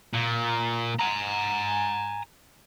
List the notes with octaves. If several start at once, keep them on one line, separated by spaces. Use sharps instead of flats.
A#2
G#5 A#5